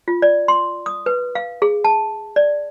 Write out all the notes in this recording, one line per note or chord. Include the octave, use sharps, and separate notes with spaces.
F4
D5
C6
D#6
B4
F5
G#4
A5
D5